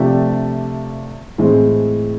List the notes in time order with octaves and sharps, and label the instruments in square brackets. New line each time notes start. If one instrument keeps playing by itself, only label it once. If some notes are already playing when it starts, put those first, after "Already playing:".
Already playing: [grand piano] C3 F3 A3 D4 G4
A2 E3 G#3 C4